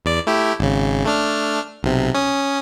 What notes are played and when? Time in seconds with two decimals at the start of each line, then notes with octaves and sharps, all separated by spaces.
0.05 E2 D5
0.27 A3 E4 G4
0.59 G#1 C#3
1.05 A3 D4 F6
1.83 B1 C3
2.15 C#4 D#6